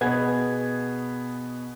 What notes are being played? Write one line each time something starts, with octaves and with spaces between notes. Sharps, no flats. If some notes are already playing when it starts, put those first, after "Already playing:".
B2 B3 G#4 G#6